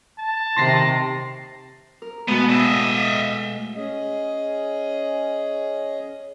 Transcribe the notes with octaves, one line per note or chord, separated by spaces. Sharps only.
A5
C3 D#3 C6 A#6 C7
A#4
B2 G#3 A3 B3
D#5 E5
C#4 G#4 D#5